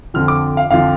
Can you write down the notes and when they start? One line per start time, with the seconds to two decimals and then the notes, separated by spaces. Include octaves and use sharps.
0.14 F2 D3 F3 F6
0.28 D6
0.57 F5
0.71 F2 D3 F3 F5